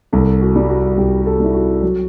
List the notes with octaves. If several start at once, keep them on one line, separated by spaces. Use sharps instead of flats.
C2 A4
F#4
G3
F#4
C2 G4
G4
A4
G3 E4
F#4
F#3